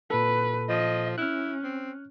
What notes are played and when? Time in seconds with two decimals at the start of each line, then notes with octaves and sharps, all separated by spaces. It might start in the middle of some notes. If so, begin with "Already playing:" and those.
0.10 A#2 A4 B4
0.69 F3 D#5
1.18 C#4 E4 F6 F#6
1.63 C4